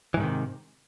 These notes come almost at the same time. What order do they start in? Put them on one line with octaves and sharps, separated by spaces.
E3 G#2 D#3 C3